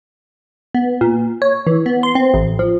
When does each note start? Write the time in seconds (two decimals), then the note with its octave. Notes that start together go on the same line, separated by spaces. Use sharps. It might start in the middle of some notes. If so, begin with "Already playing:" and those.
0.74 B3
1.01 A#2
1.42 C#5
1.67 E3
1.86 B3
2.03 C6
2.15 C4
2.34 A1
2.59 F3